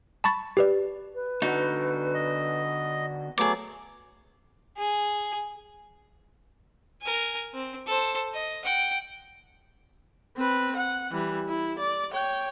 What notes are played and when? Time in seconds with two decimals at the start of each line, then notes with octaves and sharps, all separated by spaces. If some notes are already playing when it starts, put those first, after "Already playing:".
0.24 A5 B5 C#6 A6
0.57 G4 B4 D5
1.15 B4
1.42 D3 B3 D#4 F#4
2.14 D#5
3.38 F#3 A3 B3 G#4 D6
4.78 G#4
7.02 A#4 G#5
7.54 C4
7.86 A4 C5
8.34 D#5
8.65 F#5 G5
10.37 C4 B4
10.76 F#5
11.12 E3 G3
11.48 E4
11.78 D5
12.12 C#5 G5